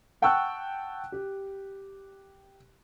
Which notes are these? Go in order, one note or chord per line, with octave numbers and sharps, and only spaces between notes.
F#5 G5 A5 C#6 E6 F#6
G4